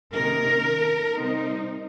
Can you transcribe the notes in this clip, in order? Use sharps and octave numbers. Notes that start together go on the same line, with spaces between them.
C3 D#3 A#3 C#4 A#4
C3 G3 C4 D#4